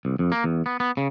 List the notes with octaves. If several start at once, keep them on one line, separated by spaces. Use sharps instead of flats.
C2
F2
A#3
E2
B3
B3
C#3